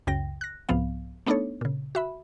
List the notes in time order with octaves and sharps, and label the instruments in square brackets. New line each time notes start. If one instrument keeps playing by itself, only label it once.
[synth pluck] C#2 F#2 C#3 G5 A#6
F#6 A#6
C2 G#2 F3 B3 F5
A3 B3 D4 D#4 A4 C#5
A#2 C#3
F#4 E5 B5